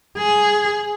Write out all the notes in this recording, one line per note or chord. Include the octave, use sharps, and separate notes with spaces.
G#4